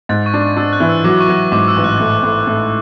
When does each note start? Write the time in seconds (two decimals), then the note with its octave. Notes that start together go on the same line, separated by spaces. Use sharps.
0.09 G#2 A6
0.26 C#6
0.34 D4
0.41 C#6
0.57 D4 E6
0.73 F#6
0.80 E3
0.89 E6
1.04 F#3 D6
1.21 C#6
1.28 F#3
1.36 C#6
1.52 G#2 D6
1.68 E6
1.76 A1
1.84 F#6
2.00 A2
2.23 A2
2.47 A2